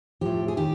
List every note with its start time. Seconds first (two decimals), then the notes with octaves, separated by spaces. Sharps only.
0.21 A2 F3 G4
0.48 G#4
0.57 D#3 G4